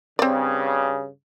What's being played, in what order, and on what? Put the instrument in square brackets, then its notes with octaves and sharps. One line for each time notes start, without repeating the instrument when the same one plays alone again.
[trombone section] G2 C#3 [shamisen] C4 D5